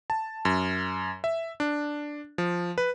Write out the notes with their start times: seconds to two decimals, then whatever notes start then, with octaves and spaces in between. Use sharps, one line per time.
0.10 A5
0.45 F#2
1.24 E5
1.60 D4
2.38 F3
2.78 B4